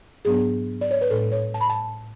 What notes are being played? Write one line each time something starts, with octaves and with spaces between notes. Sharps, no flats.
G#2 F#3 B3 D4 G#4
D5
C#5
B4
A2 G#3 D4 A4
C#5
A5
B5
A5